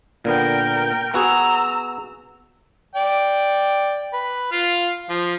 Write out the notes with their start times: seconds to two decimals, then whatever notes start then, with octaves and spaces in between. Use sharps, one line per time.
0.25 A#2 D3 B3 A#4 G5
1.14 B3 F#4 G#4 A#5 E6
2.96 D5 G5
4.13 B4
4.52 F4 F5
5.10 F3